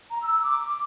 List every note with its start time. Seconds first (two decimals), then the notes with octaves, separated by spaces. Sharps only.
0.11 A#5
0.22 E6
0.32 E6
0.43 D6